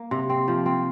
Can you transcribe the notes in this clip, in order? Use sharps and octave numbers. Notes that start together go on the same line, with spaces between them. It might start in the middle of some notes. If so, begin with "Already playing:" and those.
Already playing: A#3
C3
C4
F3
C4